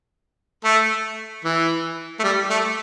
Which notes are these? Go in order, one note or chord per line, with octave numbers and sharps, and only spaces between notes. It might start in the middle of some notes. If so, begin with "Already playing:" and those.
A3
E3
A3
G3
A3